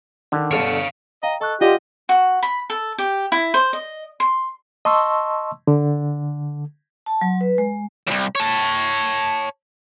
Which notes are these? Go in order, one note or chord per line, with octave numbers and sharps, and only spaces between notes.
D3 D#3
G1 A4 C#5 F5 C#7
D#5 F5 G5 A#5
A4 D#5 C#6 F#6
F4 G4 D5 D#5 F#5
F#4
B5
A4
G4
E4
C5
D#5
C6
D#5 A5 C6 C#6 E6
D3
A5
F#3
B4
G#3
C2 F#2
C#5 A5